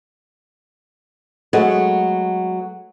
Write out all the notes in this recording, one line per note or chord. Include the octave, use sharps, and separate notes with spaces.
F#3 G#3 A3 B3